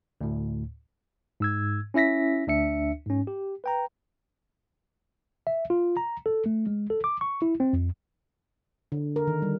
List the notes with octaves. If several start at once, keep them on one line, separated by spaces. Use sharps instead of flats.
D2 A2
G#2 E6 G#6
C#4 E4 E5 A#6 B6
D2 D4 E5 C#7
G#2 C#4
G4
B4 G5 A#5
E5
F4
A#5
A4
A3
G#3
A4
D6
C#6
E4
C4
F2
D3
A#4
D#3
G3